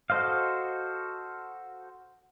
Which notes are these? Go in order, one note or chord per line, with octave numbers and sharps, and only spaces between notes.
F#4 A4 C5 D#5 F5